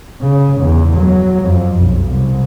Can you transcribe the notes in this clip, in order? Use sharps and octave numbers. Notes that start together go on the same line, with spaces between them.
C#3
E2
F#3
F2
B1
C2